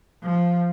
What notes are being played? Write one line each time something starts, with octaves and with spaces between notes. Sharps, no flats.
F3